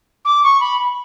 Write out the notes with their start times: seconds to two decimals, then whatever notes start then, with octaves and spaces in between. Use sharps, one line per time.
0.25 D6
0.44 C#6
0.60 B5